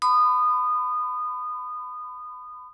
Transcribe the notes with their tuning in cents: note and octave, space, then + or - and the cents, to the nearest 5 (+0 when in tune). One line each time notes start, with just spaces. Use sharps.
B5 +30 D#6 -20